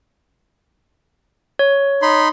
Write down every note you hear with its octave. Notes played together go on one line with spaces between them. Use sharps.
C#5
D#4 B5 C6